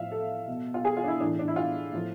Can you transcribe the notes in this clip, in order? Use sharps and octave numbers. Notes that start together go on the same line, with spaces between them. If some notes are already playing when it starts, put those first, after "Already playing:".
Already playing: A2 F3 E5 F5
A4
B2
F4
G#4
F4
D4
E4
A2 E3 D4
D4
E4
F4
A2 F3